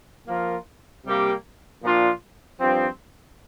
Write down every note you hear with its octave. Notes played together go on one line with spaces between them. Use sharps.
F3 A#3 F4 A#4
C3 G3 A#3 G4
A#2 F3 D4 F4
G2 F3 C4